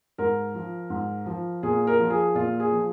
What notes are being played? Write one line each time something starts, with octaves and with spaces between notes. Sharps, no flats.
G#2 A#4
F3
G#2
F3
A#2 G#4
A#4
F3
G#4
A#2 F4
G#4
F3